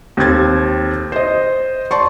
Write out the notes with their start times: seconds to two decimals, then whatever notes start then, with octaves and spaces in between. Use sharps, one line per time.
0.17 D#2 C4 A4 G#6 A6
1.12 C5 D#5
1.91 D5 A5 C6 C#6